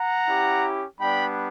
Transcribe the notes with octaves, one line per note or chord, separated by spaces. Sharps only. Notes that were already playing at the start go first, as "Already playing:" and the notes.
Already playing: F#5 A#5
C#4 E4 G4
G3 B3 D4 G5 B5